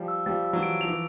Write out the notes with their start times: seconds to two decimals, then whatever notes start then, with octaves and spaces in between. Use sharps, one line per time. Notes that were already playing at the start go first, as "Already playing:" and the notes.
Already playing: F3 G3
0.08 E6
0.26 F3 G3 A6
0.45 E6
0.53 E3 F#3
0.63 D7
0.81 F3 F7
0.88 E3